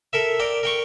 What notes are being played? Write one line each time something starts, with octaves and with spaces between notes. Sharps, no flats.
A4 A#4 E5
A#4 D5 G5
A#4 G5 C#6